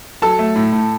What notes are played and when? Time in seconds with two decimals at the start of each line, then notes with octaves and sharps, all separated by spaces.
0.22 F#3 A4 A5
0.39 A3
0.55 A2
0.72 A2